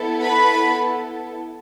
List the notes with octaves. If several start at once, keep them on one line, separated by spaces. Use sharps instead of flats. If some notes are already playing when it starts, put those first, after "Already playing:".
Already playing: B3 E4 A4
B4 B5